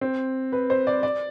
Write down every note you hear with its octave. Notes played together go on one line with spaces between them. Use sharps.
C4
B4
C5
D5
D5